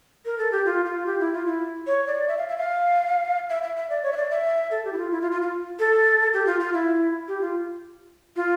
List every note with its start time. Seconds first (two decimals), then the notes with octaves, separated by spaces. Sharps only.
0.25 A#4
0.38 A4
0.52 G4
0.66 F4
0.86 F4
1.06 G4
1.20 E4
1.33 F4
1.47 E4
1.87 C#5
2.07 D5
2.28 E5
2.38 F5
2.48 E5
2.58 F5
3.50 E5
3.63 E5
3.76 E5
3.90 D5
4.03 C#5
4.13 E5
4.17 D5
4.31 E5
4.71 A4
4.85 G4
4.93 E4
4.98 F4
5.12 E4
5.22 F4
5.32 F4
5.42 F4
5.79 A4
6.33 G4
6.46 F4
6.60 F4
6.73 E4
7.28 G4
7.41 F4
8.36 F4